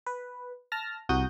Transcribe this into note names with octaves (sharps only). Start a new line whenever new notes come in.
B4
A5 F6 A#6
C2 F#4 D#6 G6